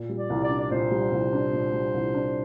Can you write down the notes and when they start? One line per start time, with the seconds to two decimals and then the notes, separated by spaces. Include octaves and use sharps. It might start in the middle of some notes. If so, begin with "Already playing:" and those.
Already playing: A#2
0.09 G3
0.16 D5
0.30 C2
0.44 D5
0.50 D4
0.59 D5
0.71 A#2 C5
0.91 G3
1.12 C2
1.33 D4
1.53 A#2
1.73 G3
1.94 C2
2.15 D4